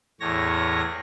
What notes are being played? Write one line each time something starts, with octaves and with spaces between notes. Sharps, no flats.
E2 A2 C#5 A#6